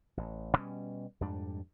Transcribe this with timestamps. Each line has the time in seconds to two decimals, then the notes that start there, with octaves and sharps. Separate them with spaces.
0.17 A1
0.57 B2 G3 C#4
1.21 F2 G#2 G3 D4